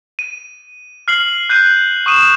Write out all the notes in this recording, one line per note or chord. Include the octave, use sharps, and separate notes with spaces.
D#7
F6 C7 F#7
F#6 G6 C7 D#7
C#6 D#6 D#7 E7